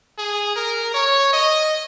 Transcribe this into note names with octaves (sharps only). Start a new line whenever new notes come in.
G#4
A#4
C#5
D#5